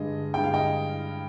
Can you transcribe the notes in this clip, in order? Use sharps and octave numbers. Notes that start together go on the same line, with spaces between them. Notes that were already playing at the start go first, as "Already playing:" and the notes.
Already playing: G2 D3 G#3 D#5
G2 D3 G#3 G5
F5
D#5 G5